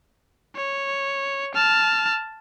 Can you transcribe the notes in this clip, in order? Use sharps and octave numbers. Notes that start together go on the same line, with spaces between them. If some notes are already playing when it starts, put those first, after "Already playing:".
C#5
A5 F6